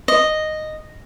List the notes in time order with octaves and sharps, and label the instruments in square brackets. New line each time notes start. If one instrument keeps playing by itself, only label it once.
[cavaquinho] D#5